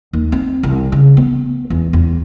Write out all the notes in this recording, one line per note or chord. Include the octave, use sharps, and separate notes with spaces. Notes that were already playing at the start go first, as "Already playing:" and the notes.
D#2
C4
C2
C#3
B3
E2
E2